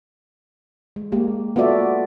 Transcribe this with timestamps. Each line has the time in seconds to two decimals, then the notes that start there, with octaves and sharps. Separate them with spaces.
0.96 G#3
1.12 G#3 A#3 G4
1.56 B3 F4 F#4 A4 D5 E5